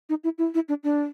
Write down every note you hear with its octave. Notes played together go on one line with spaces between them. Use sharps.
D#4
E4
E4
E4
D4
D4